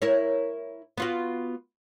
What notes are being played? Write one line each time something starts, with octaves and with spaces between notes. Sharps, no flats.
E4 A#4 C#5
B3 F4 F#4